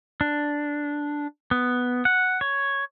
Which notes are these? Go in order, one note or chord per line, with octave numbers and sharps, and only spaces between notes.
D4
B3
F#5
C#5